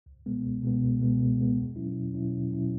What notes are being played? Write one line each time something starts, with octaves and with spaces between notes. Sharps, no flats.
C#2
B2 G#3 B3
C#2
B2 G#3 B3
C#2
B2 G#3 B3
C#2
B2 G#3 B3
E2
B2 F#3 C#4 E4
E2
B2 F#3 C#4 E4
E2
B2 F#3 C#4 E4